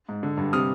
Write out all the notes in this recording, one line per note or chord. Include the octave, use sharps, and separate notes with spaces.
G#2
D3
G2
C3 D#6 F6